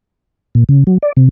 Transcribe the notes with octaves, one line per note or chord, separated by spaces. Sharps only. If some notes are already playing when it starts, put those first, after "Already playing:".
A#2
C#3
F#3
D5
C3